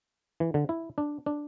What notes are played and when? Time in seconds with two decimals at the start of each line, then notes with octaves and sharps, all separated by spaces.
0.40 E3
0.54 D3
0.69 E4
0.98 D4
1.26 D4